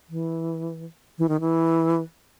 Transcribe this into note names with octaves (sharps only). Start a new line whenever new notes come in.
E3
E3
D#3
E3